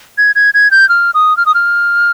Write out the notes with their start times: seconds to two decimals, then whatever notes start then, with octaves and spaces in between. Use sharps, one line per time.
0.18 G#6
0.36 G#6
0.54 G#6
0.71 G6
0.89 F6
1.14 D#6
1.37 F6
1.46 D#6
1.55 F6